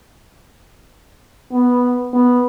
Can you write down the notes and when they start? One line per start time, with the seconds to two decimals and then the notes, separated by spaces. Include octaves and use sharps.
1.52 B3
2.13 B3